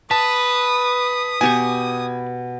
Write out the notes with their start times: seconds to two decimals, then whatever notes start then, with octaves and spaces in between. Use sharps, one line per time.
0.11 B4 A5 D#6
1.41 B2 G4 G#5 C#6